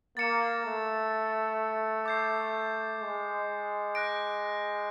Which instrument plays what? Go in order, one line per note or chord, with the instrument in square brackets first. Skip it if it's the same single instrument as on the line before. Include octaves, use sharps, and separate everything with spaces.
[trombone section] A#3 [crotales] A6 C#7 E7
[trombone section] A3
[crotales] D6 G6 C7
[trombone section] G#3
[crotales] F#6 A#6 D7